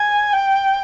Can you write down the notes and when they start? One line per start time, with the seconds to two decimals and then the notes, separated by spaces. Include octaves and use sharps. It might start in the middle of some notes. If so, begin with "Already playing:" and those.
Already playing: G#5
0.33 G5